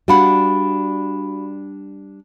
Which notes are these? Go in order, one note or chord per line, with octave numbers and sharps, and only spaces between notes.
G3 D4 F#4 F5 F#5 B5